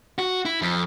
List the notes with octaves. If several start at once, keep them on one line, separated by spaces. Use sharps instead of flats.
F#4
E4
F2